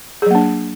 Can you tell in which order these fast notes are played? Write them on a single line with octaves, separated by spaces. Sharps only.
G#4 F#3 A#3 D4